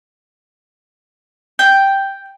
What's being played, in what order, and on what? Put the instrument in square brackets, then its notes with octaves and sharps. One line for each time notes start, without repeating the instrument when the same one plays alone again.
[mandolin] G5